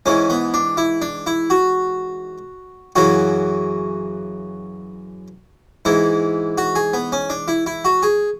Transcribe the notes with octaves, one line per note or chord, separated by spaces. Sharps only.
G#2 E3 C#4
B3
D4
E4
D4
E4
F#4
F#2 C#3 E3 F#4
G#2 E3 E4
F#4
G#4
B3
C#4
D4
E4
E4
F#4
G#4